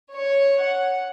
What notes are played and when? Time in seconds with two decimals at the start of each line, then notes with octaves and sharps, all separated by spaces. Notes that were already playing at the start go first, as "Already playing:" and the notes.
0.14 C#5
0.63 F#5